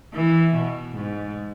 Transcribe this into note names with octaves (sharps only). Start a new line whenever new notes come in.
E3
B2
G#2